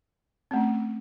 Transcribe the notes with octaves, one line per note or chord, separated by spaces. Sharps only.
A3 C4 C#4